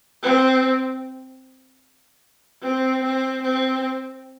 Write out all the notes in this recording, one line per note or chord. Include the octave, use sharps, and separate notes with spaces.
C4
C4
C4
C4